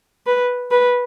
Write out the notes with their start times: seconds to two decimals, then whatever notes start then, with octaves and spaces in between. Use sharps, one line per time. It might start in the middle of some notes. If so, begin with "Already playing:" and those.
0.27 B4
0.71 B4